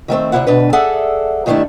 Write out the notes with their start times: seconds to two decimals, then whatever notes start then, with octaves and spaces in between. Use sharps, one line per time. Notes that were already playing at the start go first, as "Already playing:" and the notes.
0.08 D#3 A3 A#3 C4
0.32 D2 G2 C3 E4 F#5
0.47 D2 B2 D4 B4
0.73 G#4 A4 D5 E5 F#5
1.46 G2 D#3 G3 A3 D4 E4